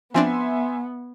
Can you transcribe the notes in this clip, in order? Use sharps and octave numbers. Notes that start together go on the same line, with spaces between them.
F3 B3 C4 D4 E5 G#5 C6